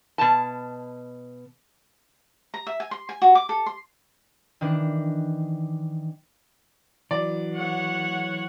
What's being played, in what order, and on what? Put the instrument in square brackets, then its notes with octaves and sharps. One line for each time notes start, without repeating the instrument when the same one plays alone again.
[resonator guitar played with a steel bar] B2 A5
[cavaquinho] A#5
E5
G#5
C6
G#5
F#4
D6
A4
C6
[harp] D#3 E3 D4
[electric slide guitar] E3 F#3 [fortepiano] D5
[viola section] C#5 F#5